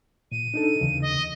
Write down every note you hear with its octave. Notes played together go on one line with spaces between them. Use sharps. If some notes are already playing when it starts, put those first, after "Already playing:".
A#2 D#7
D4 D#4 A4
D#2 C#3 E3
D#5